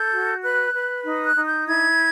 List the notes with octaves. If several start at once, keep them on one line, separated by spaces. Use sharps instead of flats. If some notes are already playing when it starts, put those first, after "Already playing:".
Already playing: A4 G6
F#4
B4 F#6
B4
D#4
F#6
D#4
G6
E4 G#6